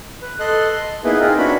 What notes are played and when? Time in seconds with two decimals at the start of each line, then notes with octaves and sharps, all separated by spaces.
0.22 B4
0.40 A4 D#5 C6 F#6
0.72 C6
1.04 A#3 B3 D#4 E4 G#4 B4
1.20 C4 D#4 F4 A#4
1.38 C#4 D4 F#4 B5